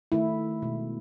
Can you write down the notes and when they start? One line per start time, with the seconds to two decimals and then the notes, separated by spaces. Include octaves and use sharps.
0.12 D#3 A3 E4
0.62 B2 G#3